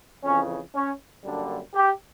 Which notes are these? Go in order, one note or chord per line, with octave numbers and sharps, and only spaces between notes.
F2 C#3 E3 C#4
C#4
F#2 D3 G3 A#3 D4
G4